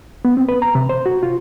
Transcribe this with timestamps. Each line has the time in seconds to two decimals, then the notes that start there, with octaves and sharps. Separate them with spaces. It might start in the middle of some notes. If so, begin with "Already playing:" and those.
0.25 B3
0.37 C4
0.49 B4
0.62 A#5
0.75 C3
0.89 C5
1.06 F#4
1.23 F4